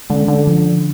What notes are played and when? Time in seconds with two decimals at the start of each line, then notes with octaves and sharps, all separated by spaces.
0.10 D3 G#3 C#4
0.28 D3
0.47 F3